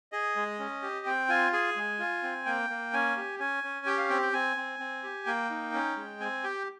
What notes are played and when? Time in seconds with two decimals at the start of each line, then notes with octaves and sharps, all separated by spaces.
0.12 G#4 D#5
0.36 G#3
0.59 C#4
0.82 G4
1.06 C4 G5
1.29 F4 G#5
1.53 G#4 G#5
1.76 G#3
1.99 F4
2.23 C4
2.46 A#3 G5
2.70 A#3
2.93 C#4 G#5
3.17 G4
3.39 C#4 G#5
3.64 C#4
3.86 G4 G5
3.98 F5
4.10 C4 G5
4.22 G5
4.33 C4 G#5
4.57 C4
4.79 C4
5.03 G4
5.26 A#3 G5
5.50 D#4
5.74 C#4
5.96 G#3
6.20 C4 G#5
6.44 G4 G5